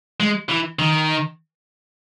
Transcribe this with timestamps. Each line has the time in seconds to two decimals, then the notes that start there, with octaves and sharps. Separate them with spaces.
0.20 G#3
0.49 E3
0.79 D#3